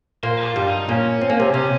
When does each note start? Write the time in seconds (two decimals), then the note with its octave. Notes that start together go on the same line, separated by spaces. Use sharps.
0.23 A#2 A#3 C5
0.45 F4
0.56 G2 G3
0.68 D#4
0.89 A#2 A#3 C#4
1.22 C4
1.30 A#3
1.40 C3 C4
1.53 C3 C4 C#4